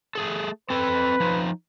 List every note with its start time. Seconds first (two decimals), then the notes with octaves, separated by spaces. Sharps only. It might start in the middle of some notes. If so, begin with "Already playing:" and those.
0.15 A3 G#4 A4
0.70 C4 A4 B4
1.20 F3 D#4